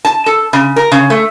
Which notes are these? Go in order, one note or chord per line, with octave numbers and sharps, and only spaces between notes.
A5
A4
C#3
A#4
C#3
A3